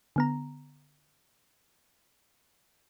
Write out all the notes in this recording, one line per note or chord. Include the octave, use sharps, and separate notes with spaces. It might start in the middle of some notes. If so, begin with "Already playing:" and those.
D3 B3 A#5